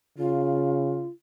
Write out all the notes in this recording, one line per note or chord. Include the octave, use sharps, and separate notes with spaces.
C#3 F4